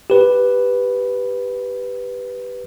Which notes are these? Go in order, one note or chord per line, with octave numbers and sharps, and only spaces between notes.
G4 B4